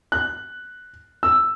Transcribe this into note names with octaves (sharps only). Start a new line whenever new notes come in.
F#6
E6